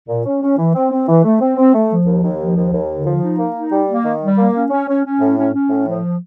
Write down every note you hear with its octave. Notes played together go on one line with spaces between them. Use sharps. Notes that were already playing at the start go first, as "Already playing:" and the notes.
A#2
C#4
C#4
E3
C4
C4
E3
A3
C4
C4
A3
F3
D#2
D#2
F3
D#2
D#2
D3
F3
D#4
A#3
D#4
G3
A#3
D#3
G3
A#3
C#4
C#4
C#4
C#4
A2
C#4
C#4
A2
F3